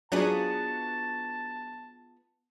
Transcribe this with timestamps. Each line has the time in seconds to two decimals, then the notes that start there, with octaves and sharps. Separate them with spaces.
0.12 F#3 B3 D4 F4 G#4 A5